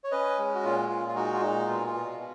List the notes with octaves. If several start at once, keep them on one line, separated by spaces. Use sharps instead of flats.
C#5
C#4 B4 D#5
G#3
F#4
A#2 F4
A#2 F4
F4
G#3 D#4 F#4
F4
A#2 D#4
B2 F4
F4
B2
B2